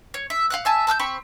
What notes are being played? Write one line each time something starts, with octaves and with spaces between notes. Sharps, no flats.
C#5
E5
F5 F#5 F#6
E5 G#5 A5
A5 E6 F6 G6
C4 B5 C#6